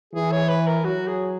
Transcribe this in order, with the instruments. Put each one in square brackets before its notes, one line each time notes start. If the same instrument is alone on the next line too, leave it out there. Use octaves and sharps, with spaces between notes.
[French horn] E3 [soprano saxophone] G#4
[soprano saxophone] C#5
B4
A#4
[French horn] F#3 [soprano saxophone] F#4
[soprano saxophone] G#4